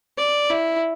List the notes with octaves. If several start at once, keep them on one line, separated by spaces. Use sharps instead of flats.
D5
E4